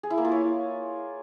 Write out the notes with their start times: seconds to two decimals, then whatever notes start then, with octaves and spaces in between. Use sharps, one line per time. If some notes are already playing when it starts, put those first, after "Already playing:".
0.03 G#4
0.10 E4
0.18 A#3
0.25 F4
0.32 C#5